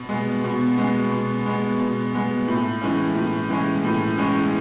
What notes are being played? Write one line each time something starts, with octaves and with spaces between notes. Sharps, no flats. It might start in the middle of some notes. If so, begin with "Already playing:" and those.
Already playing: B2
G#3 B3
B2
G#3 B3
B2
G#3 B3
B2
G#3 B3
A2
E3 G#3 C#4
A2
E3 G#3 C#4
A2
E3 G#3 C#4